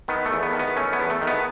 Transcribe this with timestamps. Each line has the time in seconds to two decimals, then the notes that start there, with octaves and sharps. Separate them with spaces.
0.08 D#3 B3
0.26 A3
0.31 E2
0.43 B3
0.53 D#3
0.60 B3
0.76 A3 C#4
0.93 B3
0.99 E2
1.10 A3
1.21 D#3
1.27 B3